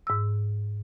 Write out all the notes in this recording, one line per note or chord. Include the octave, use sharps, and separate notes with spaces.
G#2 E6